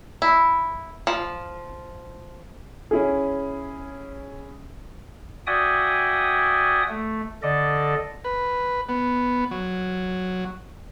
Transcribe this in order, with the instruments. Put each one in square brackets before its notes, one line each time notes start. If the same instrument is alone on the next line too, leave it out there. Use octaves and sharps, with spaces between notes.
[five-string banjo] E4
F3
[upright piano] C#4 E4 G#4
[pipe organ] F#4 D5 E5 G5 G#5 D#6
A3
D3 A4 D5 D#5
[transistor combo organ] B4
B3
F#3